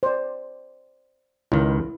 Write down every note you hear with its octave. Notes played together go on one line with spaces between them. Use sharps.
C5 D5
C#2 D#3 E4